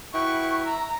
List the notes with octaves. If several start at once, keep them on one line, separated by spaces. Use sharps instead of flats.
E4 F#4 B4 G5 C#6
A#5 E6